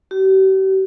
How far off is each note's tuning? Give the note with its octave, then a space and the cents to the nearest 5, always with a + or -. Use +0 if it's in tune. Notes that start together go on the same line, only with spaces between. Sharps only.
G4 -40